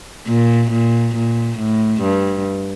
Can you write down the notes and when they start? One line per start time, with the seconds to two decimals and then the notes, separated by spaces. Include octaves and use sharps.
0.28 A#2
0.71 A#2
1.15 A#2
1.58 A2
2.02 G2